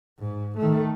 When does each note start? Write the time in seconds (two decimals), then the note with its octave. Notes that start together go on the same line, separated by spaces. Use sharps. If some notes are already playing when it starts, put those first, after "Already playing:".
0.20 G#2
0.58 D#3 A3